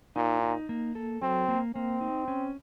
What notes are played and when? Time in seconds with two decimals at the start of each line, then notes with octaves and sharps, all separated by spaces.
0.16 A#2 D#4
0.43 D#4
0.69 A#3
0.95 A4
1.22 F#3 C4
1.48 A#3
1.75 A#3 C4
2.01 D#4
2.28 C#4